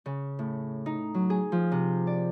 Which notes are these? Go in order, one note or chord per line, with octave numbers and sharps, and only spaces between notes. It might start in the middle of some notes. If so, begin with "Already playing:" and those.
C#3
A2
D#4
F#3
G#4
F3
C3
D5